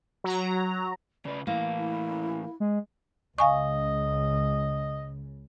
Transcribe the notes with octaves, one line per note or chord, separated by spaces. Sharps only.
F#3 A#5
C#3 B4 D5
A2 E3 A#3 E4
E4
G#3
C#2 C#3 D#5 F5 G#5 C#6